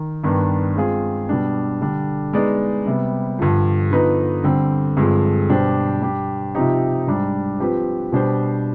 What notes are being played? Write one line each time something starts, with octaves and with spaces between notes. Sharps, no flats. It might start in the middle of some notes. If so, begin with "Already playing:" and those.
Already playing: D#3
G2 D#3 B3 D4
G#3 C4 F4 G#4
B2 G3 D4
D3 G3 D4
G#3 B3 D#4 G#4 D5
C3 G3 B3
G2 D3 F3
D3 F3 B3 D#4 B4
D3 G3 C4
G2 D3 F3 G#3 C4
B2 G3 D4 G4 C5
G3 D4 G4
C3 F3 C4 D#4 G4
G#2 G3 D4
F3 C4 G4 B4
B2 G3 D4 G4 C5